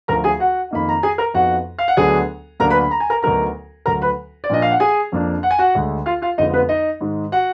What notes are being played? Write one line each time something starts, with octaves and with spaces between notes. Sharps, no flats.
D2 D3 F3 A#4 A#5
G#4 G#5
F#4 F#5
F2 D#3 A#3 D#4 B5
A#5
G#4 G#5
A#4 A#5
F2 F3 B3 D#4 F#4 F#5
F5
F#5
D2 D3 F#3 B3 D4 G#4 G#5
D2 D3 F#3 A#3 D4 A#4 A#5
B4 B5
B5
A#5
G#5
A#4 A#5
D2 D3 F#3 B3 D#4 A#4 A#5
D2 D3 F#3 A#4 A#5
B4 B5
D5
A#2 F3 A#3 D4 D#5
F5
F#5
G#4 G#5
F2 F3 A#3 D4
F#5
G#5
F#4 F#5
D2 D3 G#3
F4 F5
F4 F5
F2 D3 F3 G#3 B3 D#4 D#5
B3 B4
D#4 D#5
G#2 D#3 G#3
F#4 F#5